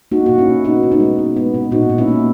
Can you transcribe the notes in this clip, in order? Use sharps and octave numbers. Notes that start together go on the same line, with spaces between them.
A#3 D#4 F#4
B2 F#4
C#4 E4
B2
B3 D#4 F#4
B2
B3 D#4
G#3
B2
B3
B2
A#2 D#4 F#4
A#2
C#4 E4
A#3